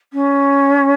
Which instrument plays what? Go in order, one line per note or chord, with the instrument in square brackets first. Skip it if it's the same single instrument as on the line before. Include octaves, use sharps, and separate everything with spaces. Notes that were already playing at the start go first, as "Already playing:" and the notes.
[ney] C#4